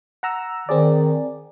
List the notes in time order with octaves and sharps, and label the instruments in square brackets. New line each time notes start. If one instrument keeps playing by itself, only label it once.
[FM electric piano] F#5 A#5 E6
[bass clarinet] D#3 [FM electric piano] C4 G#4 D5